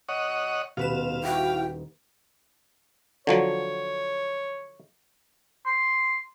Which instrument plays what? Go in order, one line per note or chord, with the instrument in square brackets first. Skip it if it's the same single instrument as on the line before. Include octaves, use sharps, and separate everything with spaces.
[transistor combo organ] C#5 D#5 F#5
[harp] D#1 [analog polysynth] B2 B4 E7 [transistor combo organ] F5
[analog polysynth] E4 F#4 [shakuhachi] G5
[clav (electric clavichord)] D3 F3 F#3 [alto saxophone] C#5
[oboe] C6